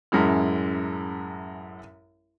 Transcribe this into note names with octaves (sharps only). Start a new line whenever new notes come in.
A1 F#2 G#3 E4 F6